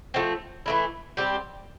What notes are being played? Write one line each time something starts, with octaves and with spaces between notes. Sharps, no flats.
F3 A3 C4
E3 A3 E4
G3 C4 G4